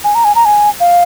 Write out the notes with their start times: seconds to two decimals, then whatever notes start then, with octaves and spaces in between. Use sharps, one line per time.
0.04 G#5
0.15 A#5
0.25 G#5
0.35 A#5
0.45 G#5
0.80 F5